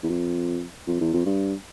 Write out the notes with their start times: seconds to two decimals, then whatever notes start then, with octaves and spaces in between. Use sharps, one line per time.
0.03 E2
0.09 F2
0.87 F2
1.01 E2
1.13 F2
1.26 G2